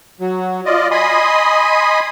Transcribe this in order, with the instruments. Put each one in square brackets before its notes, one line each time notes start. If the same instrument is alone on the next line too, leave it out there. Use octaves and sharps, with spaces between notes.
[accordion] F#3
F4 D5 D#5
D#5 G#5 B5 C6 D#6